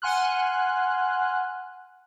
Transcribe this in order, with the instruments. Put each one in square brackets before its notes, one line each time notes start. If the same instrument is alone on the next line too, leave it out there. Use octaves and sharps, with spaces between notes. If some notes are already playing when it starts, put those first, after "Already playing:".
[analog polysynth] F#5 G#5 C6 F6 F#6